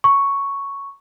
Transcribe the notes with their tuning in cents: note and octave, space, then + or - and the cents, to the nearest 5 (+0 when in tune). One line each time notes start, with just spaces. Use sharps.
A#5 +0 C#6 +0